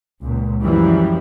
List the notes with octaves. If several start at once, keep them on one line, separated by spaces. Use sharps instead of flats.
C#2 A#2
F#2 E3 F3 G3